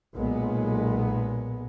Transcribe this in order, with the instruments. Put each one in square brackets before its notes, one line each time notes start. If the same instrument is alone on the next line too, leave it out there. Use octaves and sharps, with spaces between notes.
[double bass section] B1 A#2 G#3 B3